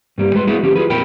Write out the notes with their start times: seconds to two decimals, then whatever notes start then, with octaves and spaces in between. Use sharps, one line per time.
0.18 G2 G3 A#3
0.35 G#3 B4 C6
0.48 A#3 B3 D#4 E4 F#4 G#4
0.63 D2 F3 C#4 G4
0.76 F4 F#4 G#4 B4
0.89 F2 A#2 A#4 G5 B5